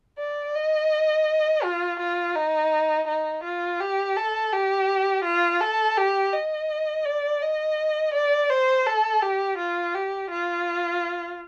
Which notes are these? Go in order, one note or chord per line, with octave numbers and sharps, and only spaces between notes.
D5
D#5
F4
F4
D#4
D#4
F4
G4
A4
G4
F4
A4
G4
D#5
D5
D#5
D5
C5
A4
G4
F4
G4
F4